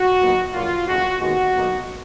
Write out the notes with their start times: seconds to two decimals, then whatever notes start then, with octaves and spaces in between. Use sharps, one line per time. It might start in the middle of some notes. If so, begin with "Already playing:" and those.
Already playing: F#4
0.20 A#2 F#3 B3 D#4
0.54 A#1 A#2 F#3 A#3 F4
0.87 F#1 F2 F3 G#3 F#4
1.21 D#2 D#3 G#3 B3 F#4
1.55 B1 B2 A#3 D#4